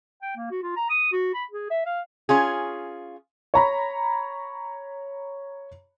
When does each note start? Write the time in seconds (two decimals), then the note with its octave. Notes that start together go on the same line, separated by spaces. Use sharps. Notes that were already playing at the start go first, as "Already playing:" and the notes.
0.22 G5
0.37 A#3
0.51 F#4
0.63 F4
0.76 A#5
0.90 D#6
1.12 F#4
1.34 B5
1.51 G#4
1.71 E5
1.86 F5
2.29 C#4 F4 G#4
3.54 C#5 A#5 B5